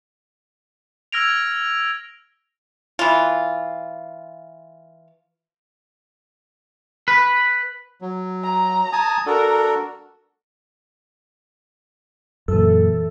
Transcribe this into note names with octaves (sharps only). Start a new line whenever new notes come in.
E6 F6 G#6 A#6 D7 F7
E3 F4
B4
F#3
A#5
G#5 A5 D#6
D4 F#4 A4 A#4
F#2 A#2 E3 A4